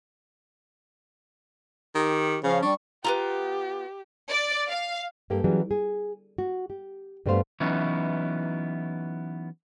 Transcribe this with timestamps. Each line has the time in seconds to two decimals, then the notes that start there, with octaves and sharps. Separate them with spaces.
1.95 D#3 G4
2.43 C#3 F3 C#4 F5
2.62 G3 D4 C#6
3.04 B3 C4 F4 G4 A#5
4.30 D5
4.69 F5
5.30 G2 A#3 G4 A4
5.44 E3 F#3 G3 C#4 G#4
5.71 G#4
6.38 F#4
6.70 G4
7.26 G2 G3 A3 B3 C5 F5
7.60 E3 F#3 B3 C#4 D#4 E4